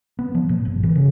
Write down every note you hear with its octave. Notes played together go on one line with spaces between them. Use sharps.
B3
F3
A#2
G1
E3
C#3